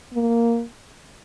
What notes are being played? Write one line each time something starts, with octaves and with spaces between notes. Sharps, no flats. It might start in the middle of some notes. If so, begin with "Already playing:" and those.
A#3